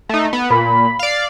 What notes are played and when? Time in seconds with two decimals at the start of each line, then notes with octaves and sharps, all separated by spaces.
0.09 A3 D#4
0.33 B3
0.50 A#2 B5
0.99 D5 F5